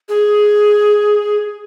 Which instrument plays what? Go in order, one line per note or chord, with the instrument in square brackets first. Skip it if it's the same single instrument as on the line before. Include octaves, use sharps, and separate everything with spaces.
[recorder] G#4